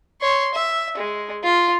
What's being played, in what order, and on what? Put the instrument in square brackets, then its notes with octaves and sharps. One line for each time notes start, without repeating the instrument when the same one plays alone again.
[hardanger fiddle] C#5 C6
E5
G#3
F4